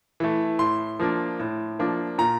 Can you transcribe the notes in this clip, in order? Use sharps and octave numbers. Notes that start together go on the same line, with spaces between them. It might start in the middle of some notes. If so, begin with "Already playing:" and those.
E3 A3
A2 C6
F3 A#3 D4
A2
F3 A#3 D4
A#2 A#5